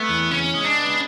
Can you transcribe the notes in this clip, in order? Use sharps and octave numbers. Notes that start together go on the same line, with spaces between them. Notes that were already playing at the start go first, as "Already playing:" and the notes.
Already playing: A3 B3
E2
C#3 C#4
G#3
D4
B3